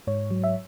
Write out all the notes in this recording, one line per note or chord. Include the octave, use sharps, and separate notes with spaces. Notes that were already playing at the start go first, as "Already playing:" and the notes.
G#2 C#5
F#3
E5